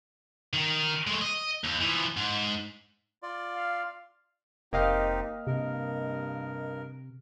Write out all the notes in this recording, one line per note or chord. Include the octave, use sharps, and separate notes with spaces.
D#3
G#3 A3
D#5
D#2
E3 F3
G#2
F4 D5
F5
F1 A#3 C4 D#4 G4 D#5 F5
G2 C3 A#4